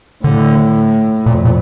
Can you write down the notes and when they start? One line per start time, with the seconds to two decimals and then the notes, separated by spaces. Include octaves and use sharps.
0.24 A2 D3
1.25 F2 A#2
1.45 A#2